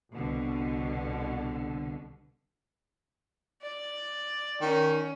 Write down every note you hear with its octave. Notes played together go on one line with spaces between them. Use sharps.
C2 B2 D3
D5
D#3 C#4